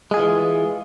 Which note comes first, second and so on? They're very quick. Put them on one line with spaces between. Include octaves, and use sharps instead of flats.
G#3 G#4 F4 E3